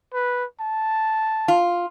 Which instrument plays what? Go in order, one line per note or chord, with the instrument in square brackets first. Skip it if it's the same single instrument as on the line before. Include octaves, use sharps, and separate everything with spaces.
[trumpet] B4
A5
[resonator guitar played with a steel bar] F4